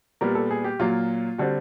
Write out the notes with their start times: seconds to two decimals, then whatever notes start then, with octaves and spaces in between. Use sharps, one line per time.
0.21 A#2 G3 B3 A#4
0.35 A4
0.51 G#4
0.64 G4
0.79 A#2 F#3 A#3 F4
1.38 D3 G3 C4 F#4